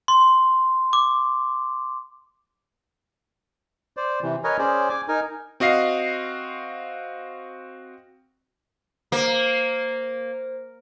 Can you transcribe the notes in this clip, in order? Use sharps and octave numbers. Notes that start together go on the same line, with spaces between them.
C6
D6
C5 D5
C3 E3
A#4 B4 C#5 D#5 G#5
C#4 G#4 C5 D5
G#5 D6
D#4 A#4 G#5
C4 F#4 D#5 F5 C7
A#3 C5